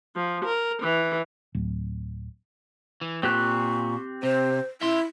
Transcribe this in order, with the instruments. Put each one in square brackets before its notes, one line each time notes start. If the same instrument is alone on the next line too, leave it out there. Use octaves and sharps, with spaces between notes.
[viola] F3
A#4
E3
[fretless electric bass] D1
[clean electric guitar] E3
[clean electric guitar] A#2 [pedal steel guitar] C4 G4 F#6 [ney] C#6
[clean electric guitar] C3 [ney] C5
[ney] E4 [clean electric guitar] E5 C6